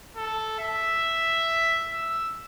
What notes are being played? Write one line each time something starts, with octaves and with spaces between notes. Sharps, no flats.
A4
E5
E6